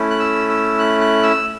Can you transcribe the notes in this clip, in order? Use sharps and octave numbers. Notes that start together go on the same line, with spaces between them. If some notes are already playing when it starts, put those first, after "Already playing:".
Already playing: A3 C#4 E4
F#6
E6
E6
F#6
F#6
E6